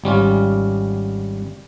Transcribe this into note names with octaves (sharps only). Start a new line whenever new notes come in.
G#1 G3 C#4 F4